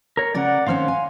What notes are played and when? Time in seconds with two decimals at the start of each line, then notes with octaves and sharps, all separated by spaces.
0.17 A#4 C#5
0.35 C#3 A#4 D5 F#5
0.66 D#3 C4 C#4 F5 C6 F6
0.88 G#5